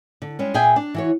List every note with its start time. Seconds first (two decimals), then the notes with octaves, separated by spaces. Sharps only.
0.22 D3
0.39 G3 G#3 C#4
0.54 A#2 G#4 E5 G5 G#5
0.76 D4
0.94 E3 F#4 C#5